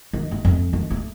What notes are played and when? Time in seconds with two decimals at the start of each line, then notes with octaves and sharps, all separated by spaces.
0.13 D#3
0.31 A3
0.45 F2
0.73 D#3
0.90 A3